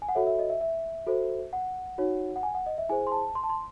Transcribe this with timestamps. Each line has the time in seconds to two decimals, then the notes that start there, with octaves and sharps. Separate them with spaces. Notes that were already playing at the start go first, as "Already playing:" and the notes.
0.02 G#5
0.09 F#5
0.15 F#4 A4 C#5 E5
0.27 E5
0.39 D#5
0.50 E5
0.61 E5
1.07 F#4 A4 C5
1.53 F#5
1.98 D#4 F#4 C#5
2.36 F#5
2.43 G#5
2.55 F#5
2.66 D#5
2.78 E5
2.89 E4 G#4 C5 G#5
3.07 C6
3.12 A5
3.35 C6
3.43 A5
3.50 C6